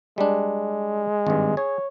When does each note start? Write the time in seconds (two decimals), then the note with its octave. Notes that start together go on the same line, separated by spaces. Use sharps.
0.18 G3 G#3 D4
1.27 G#1 G2
1.57 G#4 C#5